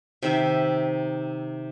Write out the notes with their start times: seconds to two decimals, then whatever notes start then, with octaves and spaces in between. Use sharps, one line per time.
0.23 C3 D#3 E5